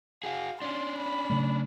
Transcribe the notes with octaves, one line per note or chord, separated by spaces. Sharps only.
F#4 G#4 F5
C#4 D4 C6
B5
C#3 F#3 A3